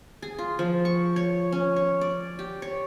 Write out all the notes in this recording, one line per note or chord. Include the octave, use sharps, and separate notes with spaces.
G#4
F4
F3
C#6
C#5
C#4
C#5
D5
G4
C#5